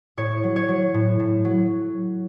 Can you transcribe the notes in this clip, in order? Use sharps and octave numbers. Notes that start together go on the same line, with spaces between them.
A2 C#5
F#3
C#5
F#3
A2
A2
F#3